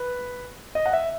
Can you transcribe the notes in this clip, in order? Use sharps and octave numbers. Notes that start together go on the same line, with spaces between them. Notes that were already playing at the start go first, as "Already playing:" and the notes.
Already playing: B4
D#5
F#5
E5